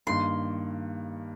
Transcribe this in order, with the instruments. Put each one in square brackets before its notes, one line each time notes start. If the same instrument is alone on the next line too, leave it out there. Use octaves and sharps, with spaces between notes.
[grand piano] G2 D#3 A#3 [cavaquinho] C6